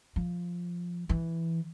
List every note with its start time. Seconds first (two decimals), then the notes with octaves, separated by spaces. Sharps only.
0.16 F3
1.09 E3